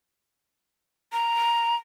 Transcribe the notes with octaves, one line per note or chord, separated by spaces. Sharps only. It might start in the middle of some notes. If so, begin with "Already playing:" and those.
A#5